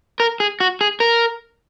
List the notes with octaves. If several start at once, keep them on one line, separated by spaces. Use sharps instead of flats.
A#4
G#4
F#4
G#4
A#4